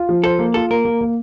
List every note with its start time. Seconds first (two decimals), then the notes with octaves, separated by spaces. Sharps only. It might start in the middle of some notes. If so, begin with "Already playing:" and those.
Already playing: F4
0.09 F3
0.24 A4 C5
0.39 A#3
0.54 F4 A4
0.70 A#3 A#4
0.85 A#3
1.01 A#3